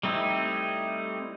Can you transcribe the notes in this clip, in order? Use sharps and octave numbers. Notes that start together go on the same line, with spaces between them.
G3 A3 C4 D#4 E4